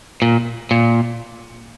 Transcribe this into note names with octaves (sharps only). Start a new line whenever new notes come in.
A#2
A#2